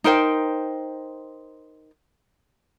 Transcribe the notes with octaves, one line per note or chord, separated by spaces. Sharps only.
D#4 A#4 C5 G5